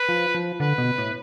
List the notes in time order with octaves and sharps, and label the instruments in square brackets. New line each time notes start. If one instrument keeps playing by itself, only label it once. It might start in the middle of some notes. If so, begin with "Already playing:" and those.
Already playing: [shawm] B4
[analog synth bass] F3
F3
[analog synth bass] D3 [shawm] B4
[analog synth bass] B2
A2